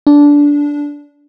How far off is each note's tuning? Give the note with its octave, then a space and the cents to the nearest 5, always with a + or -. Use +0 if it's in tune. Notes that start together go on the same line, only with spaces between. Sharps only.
D4 -15